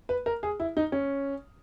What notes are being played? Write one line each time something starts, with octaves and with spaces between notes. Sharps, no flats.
B4
A#4
G#4
E4
D#4
C#4